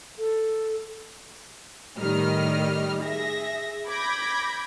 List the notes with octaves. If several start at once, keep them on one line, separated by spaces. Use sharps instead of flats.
A4
A2 D#3 G3 D#5 F6
G#4 E5 A#6
B5 D6 G6 G#6 A#6 B6